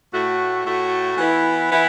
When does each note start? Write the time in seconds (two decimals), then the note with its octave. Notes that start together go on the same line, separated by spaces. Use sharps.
0.12 A2 A3 F#4
0.65 A2 A3 F#4
1.17 E3 B3 E4
1.71 E3 B3 E4